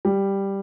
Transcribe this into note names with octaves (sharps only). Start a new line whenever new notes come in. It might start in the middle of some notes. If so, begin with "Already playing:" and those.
G3